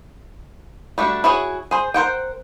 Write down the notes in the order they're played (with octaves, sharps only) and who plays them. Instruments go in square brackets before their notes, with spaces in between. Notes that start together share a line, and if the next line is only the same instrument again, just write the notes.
[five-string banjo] G3 A3 D4 F#4
E4 F#4 G#4 C#5
G#4 C5
A#4 C5 F#5 G5